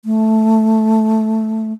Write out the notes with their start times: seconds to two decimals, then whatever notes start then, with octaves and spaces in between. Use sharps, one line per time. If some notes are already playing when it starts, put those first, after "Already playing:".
0.05 A3